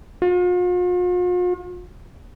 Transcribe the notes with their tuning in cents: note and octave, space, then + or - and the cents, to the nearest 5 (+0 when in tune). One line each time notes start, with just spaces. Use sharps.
F4 +45